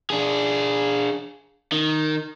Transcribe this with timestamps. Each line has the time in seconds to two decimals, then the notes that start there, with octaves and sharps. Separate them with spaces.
0.10 D4 G#4
1.72 D#3